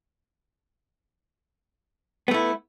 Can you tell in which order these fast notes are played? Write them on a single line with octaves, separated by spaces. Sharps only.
B3 A3 E4